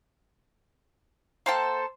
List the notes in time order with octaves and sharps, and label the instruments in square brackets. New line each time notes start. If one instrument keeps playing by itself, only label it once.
[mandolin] A#3 A4 A5 [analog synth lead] C5 [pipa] F5 G5